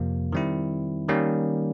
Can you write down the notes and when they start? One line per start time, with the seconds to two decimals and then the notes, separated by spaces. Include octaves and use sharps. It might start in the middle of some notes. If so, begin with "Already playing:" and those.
Already playing: F2 C3 F3 A#3
0.32 D#3 G3 C4 E4
1.08 D#3 G3 A#3 C#4